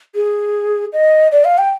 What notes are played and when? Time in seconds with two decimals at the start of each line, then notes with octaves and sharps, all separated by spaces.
0.15 G#4
0.93 D#5
1.32 D5
1.45 F5
1.58 G5